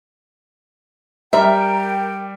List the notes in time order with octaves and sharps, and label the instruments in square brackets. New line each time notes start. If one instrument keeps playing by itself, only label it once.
[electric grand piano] G3 [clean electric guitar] A#4 [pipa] E5 [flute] G5